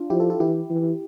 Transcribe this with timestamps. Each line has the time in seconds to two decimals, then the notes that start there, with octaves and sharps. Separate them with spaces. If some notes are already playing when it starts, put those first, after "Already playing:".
Already playing: D4 F4
0.10 F3 E4 G4
0.20 F4 A4
0.30 F4 A4
0.40 E3 E4 G4
0.70 E3